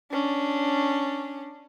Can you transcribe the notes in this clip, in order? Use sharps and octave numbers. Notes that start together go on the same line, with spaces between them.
C#4 D4